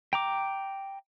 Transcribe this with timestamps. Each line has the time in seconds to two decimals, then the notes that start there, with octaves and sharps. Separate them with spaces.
0.13 G5 A#5 D6